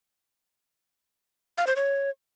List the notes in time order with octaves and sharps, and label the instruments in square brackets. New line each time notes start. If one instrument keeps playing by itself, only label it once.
[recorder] F5
C5
C#5